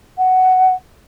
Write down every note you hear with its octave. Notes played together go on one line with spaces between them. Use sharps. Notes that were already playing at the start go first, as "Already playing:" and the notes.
F#5